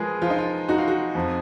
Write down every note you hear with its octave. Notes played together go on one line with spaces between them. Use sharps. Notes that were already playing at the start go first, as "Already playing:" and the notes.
Already playing: F3 G#3 G#4 A#4 B4
F3 F4
D#4
F4
D#4 F#4
F4
F#4
F2